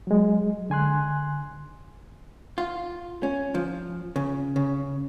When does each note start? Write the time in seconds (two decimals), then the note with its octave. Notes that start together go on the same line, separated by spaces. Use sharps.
0.07 F#3 G#3
0.70 D3 G#5 C6 F#6
2.58 F4
3.23 C#4
3.55 F3
4.16 C#3
4.56 C#3